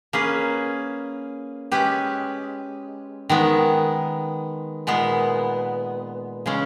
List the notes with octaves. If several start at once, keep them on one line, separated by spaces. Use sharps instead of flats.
A#3 C#4 G#4 B4
G#3 C#4 G4 B4
D#3 G#3 B3
A#2 G#3 B3
C#3 G#3 C#4